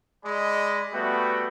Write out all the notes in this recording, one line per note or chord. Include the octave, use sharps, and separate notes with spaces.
G#3 G#4 D5 D#5 B5
G3 A3 B3 F#4 G5